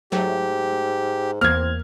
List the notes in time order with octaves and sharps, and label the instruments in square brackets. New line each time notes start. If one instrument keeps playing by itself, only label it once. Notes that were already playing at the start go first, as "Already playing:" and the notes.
[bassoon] G#2 [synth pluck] F#3 A3 [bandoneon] G4
[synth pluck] E2 A#3 [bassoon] C4 [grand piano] F6 G#6